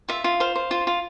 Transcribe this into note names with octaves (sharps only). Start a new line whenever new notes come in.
F4 E5
F4
C5 F5
C5
F4
F4